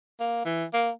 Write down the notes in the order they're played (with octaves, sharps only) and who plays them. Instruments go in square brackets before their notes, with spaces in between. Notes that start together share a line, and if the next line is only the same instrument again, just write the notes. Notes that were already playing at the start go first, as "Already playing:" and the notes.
[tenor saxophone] A#3
E3
A#3